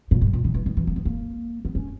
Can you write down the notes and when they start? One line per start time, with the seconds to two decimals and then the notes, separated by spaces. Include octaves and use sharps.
0.11 A#2
0.21 G2
0.33 A#2
0.44 D#3
0.54 E3
0.66 D#3
0.77 E3
0.87 A#3
0.96 B3
1.05 A#3
1.65 B3
1.75 C#4